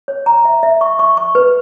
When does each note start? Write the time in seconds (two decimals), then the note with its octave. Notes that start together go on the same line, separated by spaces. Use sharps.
0.08 C#5
0.26 A#5
0.45 E5
0.63 E5
0.81 C#6
0.99 C#6
1.17 C#6
1.35 B4